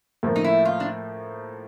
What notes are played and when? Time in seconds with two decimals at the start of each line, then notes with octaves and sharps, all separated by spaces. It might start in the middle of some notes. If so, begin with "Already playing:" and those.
0.23 A2 F3 A#3
0.36 D#4
0.44 E4
0.65 F4
0.80 D4